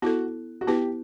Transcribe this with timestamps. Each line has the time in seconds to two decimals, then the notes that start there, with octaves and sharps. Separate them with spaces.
0.02 B3 E4 F#4 A4
0.61 F#4
0.67 B3 E4 G4 B4